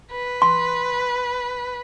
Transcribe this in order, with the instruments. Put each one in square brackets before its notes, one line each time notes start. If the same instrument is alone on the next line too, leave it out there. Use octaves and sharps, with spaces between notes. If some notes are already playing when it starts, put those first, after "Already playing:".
[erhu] B4
[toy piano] C6